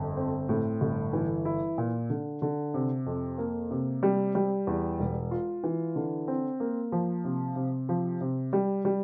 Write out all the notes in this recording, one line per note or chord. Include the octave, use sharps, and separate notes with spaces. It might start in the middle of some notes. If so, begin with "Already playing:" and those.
Already playing: G1 F2
C4
A2
G1
E3
E4
A#2
D3
D3
C3
F2
A#3
C3
G3
G3
E2
E1
F4
E3
D3
C4
A#3
F3
C3
C3
F3
C3
G3
G3